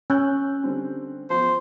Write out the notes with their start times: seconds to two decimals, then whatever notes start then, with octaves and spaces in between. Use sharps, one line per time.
0.10 C#4 E6 F#6 G6
0.64 D3 G3 C4
1.30 E2 F3 C5